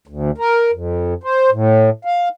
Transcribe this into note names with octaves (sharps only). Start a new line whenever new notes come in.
D2
A#4
F2
C5
A2
F5